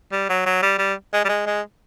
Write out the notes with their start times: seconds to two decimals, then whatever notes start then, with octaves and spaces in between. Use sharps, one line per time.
0.12 G3
0.29 F#3
0.46 F#3
0.63 G3
0.79 G3
1.13 G#3
1.25 G3
1.29 G#3
1.46 G#3